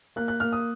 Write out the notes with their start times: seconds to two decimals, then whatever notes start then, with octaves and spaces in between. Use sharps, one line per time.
0.16 A#3 F#6
0.28 F#6
0.40 A#3 F6
0.53 D#6